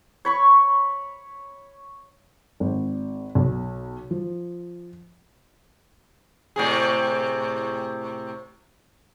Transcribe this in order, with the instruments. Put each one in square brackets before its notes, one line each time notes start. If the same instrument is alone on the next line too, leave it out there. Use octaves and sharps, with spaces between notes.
[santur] C#5 B5 C#6
[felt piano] G#1
B1
F3
[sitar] A2 C3 G#4